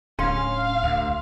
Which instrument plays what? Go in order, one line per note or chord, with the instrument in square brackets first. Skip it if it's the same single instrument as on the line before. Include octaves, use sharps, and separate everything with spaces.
[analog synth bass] D1 [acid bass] C#4 [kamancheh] F5 [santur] C6
[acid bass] D2